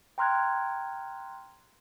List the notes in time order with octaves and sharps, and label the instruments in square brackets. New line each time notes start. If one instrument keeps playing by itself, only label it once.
[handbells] G5 A#5 C6 F6 F#6 G#6